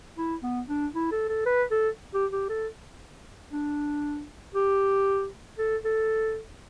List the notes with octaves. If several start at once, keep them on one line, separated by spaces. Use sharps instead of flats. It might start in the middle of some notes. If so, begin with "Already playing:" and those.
E4
B3
D4
E4
A4
A4
B4
A4
G4
G4
A4
D4
G4
A4
A4